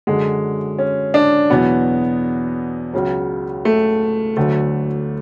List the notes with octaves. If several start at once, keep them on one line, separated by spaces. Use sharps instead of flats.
F#2 D3 F#3 G#3
C#4
D4
E2 B2 F#3 B3
C#2 C#3 F#3
A3
D2 D3 F#3 A3